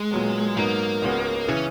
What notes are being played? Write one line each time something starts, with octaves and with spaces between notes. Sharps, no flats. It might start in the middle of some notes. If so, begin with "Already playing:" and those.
Already playing: G#3
A#2 F#3 B3
G#2 F#3 A#3 B3 D#4
C#2 C#3 G#3 B3 F#4
C#3 E3 C#4